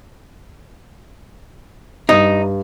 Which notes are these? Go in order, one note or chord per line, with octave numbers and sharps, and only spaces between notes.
G2 D#4